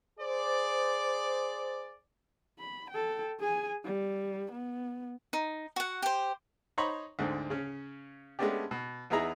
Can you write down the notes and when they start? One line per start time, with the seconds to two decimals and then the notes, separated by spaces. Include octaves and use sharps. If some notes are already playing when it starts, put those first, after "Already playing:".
0.19 G#4 C5 D5
2.59 B5
2.90 A4 G5
3.40 G#4 G#5
3.85 G3
4.52 B3
5.33 D#4
5.76 F#4 F#5
6.02 G4 C5
6.78 D#4 C5 C#5 A#5 B5 C#6
7.19 D2 G#2 D3 C4
7.50 C#3 C#4
8.39 G#3 A3 B3 C#4 D4 G4
8.71 B2
9.10 E2 B3 D#4 E4 G#4 A#5